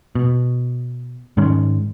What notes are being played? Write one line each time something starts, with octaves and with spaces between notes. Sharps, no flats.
B2
G#2 D#3 G#3 C#4